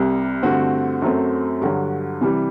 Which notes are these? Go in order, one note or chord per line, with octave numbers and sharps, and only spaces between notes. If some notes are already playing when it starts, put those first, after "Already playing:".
Already playing: C2 C3 G3
G2 D3 A3 C4 F#4
F#2 F#3 A3 C4
G2 D3 F#3
C3 E3 G3